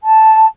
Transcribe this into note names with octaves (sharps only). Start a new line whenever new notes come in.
A5